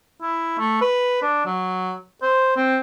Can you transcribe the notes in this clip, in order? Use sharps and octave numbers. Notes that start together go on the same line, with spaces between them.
E4
A3
B4
D4
F#3
C5
C4